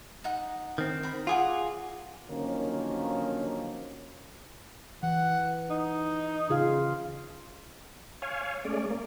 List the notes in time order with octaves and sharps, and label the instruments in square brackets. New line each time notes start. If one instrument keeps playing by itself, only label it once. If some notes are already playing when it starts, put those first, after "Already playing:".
[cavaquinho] D#4 F#5
[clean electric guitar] D#3 C4
[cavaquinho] A#4 B5
[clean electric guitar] F4 G#4 [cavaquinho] F#5 G#5 D6
[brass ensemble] D3 D#3 F3 F#3 A#3 C#4
[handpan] E3 [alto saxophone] F#5
[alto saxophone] D#4
[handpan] C#3 F4 F5 [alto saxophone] G#4
[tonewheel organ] C#5 F5 G#5
G#3 A3 C#4 D5
A#3